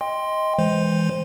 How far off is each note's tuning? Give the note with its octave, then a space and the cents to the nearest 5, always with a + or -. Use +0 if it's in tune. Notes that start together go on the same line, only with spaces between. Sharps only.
D#5 +15 G5 +25 C6 +0
E3 +0 G#3 -10 C5 +0